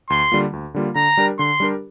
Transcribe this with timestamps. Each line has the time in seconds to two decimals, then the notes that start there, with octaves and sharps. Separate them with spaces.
0.10 D2 C6
0.32 D3 G3 A#3 F4
0.53 D2
0.74 D3 G3 A#3 F4
0.95 D3 A#5
1.17 G3 D4 G4 A#4
1.39 D3 C6
1.60 G3 D4 G4 A#4